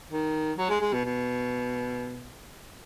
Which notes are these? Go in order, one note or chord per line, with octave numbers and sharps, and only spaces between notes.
D#3
F#3
G#3
G#3
B2
B2